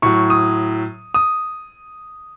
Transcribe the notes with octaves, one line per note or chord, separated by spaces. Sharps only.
A2 F#3 C#6
D#6
D#6